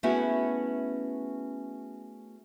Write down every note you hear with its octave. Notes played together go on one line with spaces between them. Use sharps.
A3 B3 C#4 E4 F#4 G#4